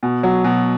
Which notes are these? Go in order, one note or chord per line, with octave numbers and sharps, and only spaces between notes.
B2
F#3
B2